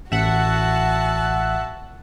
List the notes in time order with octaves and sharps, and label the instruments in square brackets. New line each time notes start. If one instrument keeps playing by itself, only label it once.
[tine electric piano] A1 [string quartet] F#4 A5 [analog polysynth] E5 F#5